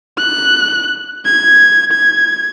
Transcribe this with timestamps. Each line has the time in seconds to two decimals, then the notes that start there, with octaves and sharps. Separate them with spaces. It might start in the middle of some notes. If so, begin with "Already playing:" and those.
0.18 F#6
1.25 G#6
1.92 G#6